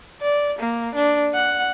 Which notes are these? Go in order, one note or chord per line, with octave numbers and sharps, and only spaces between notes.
D5
A#3
D4
F#5